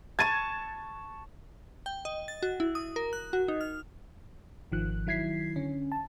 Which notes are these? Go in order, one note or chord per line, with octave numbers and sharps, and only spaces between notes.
A5 C#6 G#6 A6 D#7
G5
D#5
A6
F#4
E4
D#6
A#4
F#6
F#4
D#4
F6
G#1 D#3 F3 F#6
D#3 F#3 E4 G#6 B6 C7
D3 C#4
A5